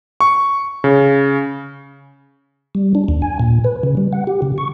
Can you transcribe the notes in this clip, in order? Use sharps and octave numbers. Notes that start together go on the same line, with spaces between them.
C#6
C#3
G3
D4
D#2
G#5
A#2
B4
C#3
G3
F#5
G4
C#3
C#6